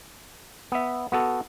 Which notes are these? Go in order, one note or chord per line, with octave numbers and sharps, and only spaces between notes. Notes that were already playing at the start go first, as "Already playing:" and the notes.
B3 E5
B3 F#4 A4